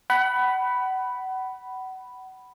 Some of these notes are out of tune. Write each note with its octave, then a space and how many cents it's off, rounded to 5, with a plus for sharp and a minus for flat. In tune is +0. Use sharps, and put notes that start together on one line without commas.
F#5 +30 B5 +0